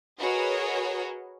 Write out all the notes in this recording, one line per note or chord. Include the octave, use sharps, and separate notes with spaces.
F#4 G#4 A#4 B4 C#5 D#5